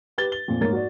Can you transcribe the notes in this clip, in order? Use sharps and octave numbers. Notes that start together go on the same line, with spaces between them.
G4 B4 A6 G7
G7
F2 A#2 F3
G#2 A#3 A#4 C#5 A6
F#4 D5